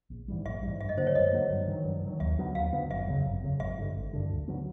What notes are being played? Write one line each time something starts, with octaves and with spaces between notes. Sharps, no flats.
A#1
G#2 E3 G3
A#1 E5
G#2 E3 G3
G2 E5
D#5
D3 F#3 A#3 C5
C#5
G2 D#5
D3 F#3 A#3
G2
D#3 F#3
G2
D#3 F#3
D#2 E5
D3 F#3 B3
D#2 F5
D3 F#3 B3
G1 E5
F2 C#3 F#3
G1
F2 C#3 F#3
G#1 E5
G2 D3
G#1
G2 D3
D2
D3 F#3 B3